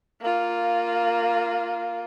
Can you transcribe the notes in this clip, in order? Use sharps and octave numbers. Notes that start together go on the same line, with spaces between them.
A#3 F4